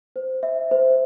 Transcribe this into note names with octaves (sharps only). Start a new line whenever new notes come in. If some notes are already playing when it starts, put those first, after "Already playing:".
C5
E5
C5